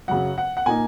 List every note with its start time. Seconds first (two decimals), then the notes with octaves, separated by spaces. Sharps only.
0.08 F#2 C#3 F#3 F#5
0.38 F#5
0.57 F#5
0.66 A#2 A#3 D#4 G#5